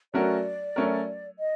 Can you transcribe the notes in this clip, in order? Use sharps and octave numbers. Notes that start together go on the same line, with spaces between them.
F#3 A3 C#4 F#4 A#4 D5
F#3 A3 C#4 F#4 A#4
D#5